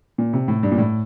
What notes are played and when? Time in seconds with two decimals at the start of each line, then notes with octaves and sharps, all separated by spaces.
0.18 A#2
0.33 C3
0.48 A2
0.63 G2
0.72 A#2
0.78 A2